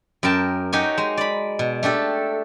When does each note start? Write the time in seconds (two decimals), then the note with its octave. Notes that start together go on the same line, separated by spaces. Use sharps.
0.23 F#2 A#4 G5 A5
0.73 D#4 F#4 G4 C#5 G#5
0.98 G#3
1.17 D5 B5
1.59 B2
1.83 A3 D4 G4 A4